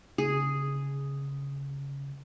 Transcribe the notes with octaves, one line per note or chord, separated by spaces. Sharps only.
C#3 G#4